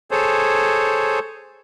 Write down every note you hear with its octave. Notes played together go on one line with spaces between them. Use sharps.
G#4 A4 C5 C#5